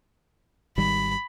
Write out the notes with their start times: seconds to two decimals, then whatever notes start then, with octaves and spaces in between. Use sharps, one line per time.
0.77 G#1 D#3 G3 B5